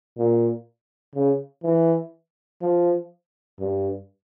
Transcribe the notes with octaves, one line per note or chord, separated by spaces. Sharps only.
A#2
C#3
E3
F3
G2